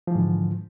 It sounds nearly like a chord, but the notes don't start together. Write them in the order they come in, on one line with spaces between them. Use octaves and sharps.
F3 E3 G#2 D3